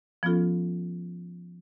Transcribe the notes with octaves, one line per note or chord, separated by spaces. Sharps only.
F3 B3 C#4 F4 A4